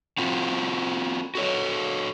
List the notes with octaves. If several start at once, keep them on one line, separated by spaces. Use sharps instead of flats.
C4 F4 F#4
F#4 A4 C#5